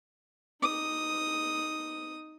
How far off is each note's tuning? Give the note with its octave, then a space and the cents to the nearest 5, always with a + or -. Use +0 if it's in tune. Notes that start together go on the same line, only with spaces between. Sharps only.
D#4 +0 D#6 +0